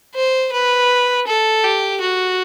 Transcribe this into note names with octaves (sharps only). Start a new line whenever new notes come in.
C5
B4
A4
G4
F#4